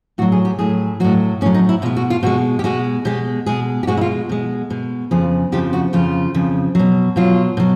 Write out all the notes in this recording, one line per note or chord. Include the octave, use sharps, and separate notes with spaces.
A2 F#3 F#4
G#4
G4
A2 F#3 G#4
A2 F#3 F#4
A2 F#3 C#4
D#4
E4
B2 G#3 F4
F#4
F4
B2 G#3 F#4
G4
B2 G#3 F#4
B2 G#3 G4
B2 G#3 G#4
G4
B2 G#3 F#4
E4
F4
B2 G#3
B2 G#3
F2 C#3 F3 G#4
F2 C#3 F3 G4
F#4
F2 C#3 F3 F4
F2 C#3 F3
B2 F#3
B2 F#3 F4
B2 F#3